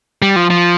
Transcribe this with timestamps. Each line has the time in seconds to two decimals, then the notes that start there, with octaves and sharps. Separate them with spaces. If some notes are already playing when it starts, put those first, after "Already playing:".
0.22 G3
0.36 F3
0.50 F3